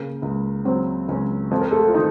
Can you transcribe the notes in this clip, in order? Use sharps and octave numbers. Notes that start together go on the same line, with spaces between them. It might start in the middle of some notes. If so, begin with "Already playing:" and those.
Already playing: C#3 A#3 A#4
C#2
F#3 C4 C5
C#2 C#4 C#5
F2 A4
A#4
A3 A4
F4
D#3 F3 D#4